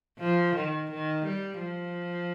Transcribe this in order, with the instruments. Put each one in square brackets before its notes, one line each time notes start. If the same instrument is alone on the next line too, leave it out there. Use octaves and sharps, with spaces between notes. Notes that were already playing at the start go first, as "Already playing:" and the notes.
[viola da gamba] F3
D#3
D#3
G3
F3